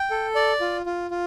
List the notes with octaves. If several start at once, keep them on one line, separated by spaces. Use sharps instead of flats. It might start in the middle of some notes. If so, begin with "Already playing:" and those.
Already playing: G5
A4
D5
F4
F4
F4